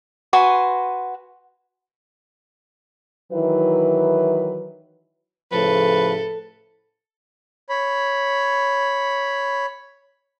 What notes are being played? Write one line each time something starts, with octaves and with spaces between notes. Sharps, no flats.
F#4 B4 G#5 C6
D#3 E3 F#3 E4 B4
A2 C#3 F3 A4 B4
C#5 B5